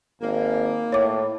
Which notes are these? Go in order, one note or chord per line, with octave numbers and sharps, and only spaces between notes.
G#1 A#3
A2 C#5 D6